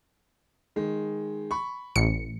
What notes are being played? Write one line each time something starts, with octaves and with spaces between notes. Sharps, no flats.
D#3 G#3
B5 C#6
A1 C#7